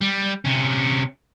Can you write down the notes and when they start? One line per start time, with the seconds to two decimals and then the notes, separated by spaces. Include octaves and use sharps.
0.01 G3
0.45 C3 C#4